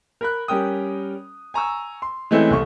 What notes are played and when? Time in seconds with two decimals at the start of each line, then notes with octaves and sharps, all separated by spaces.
0.21 A#4 B5 F#6
0.48 G3 C#4 A#4 G5 D#6
1.54 G#5 A#5 C#6 E6
2.02 C6
2.31 E3 G#3 A3 C4 C#4 E4
2.50 C2 A3 C#6